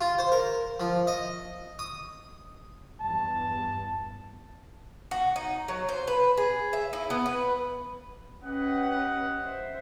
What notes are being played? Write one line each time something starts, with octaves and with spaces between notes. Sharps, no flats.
F4
C5
A#4
F3
D#5
D#6
E2 G2 A5
F#4
D#4
F#3
C5
B4
G#4
E5
E4
B3
B4
C#4 G4 B4 D#5 F#5
C5 E5